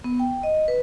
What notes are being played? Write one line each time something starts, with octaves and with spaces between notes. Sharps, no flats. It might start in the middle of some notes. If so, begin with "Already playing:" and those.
B3
G5
D#5
B4